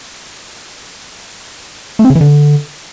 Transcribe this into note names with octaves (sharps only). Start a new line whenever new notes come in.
A3
C4
C#3
E3
D3